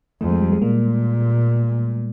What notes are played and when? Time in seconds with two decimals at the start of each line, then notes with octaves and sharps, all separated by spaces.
0.21 F2 A3
0.30 G#3
0.42 G3
0.52 G#3
0.62 A#2 A#3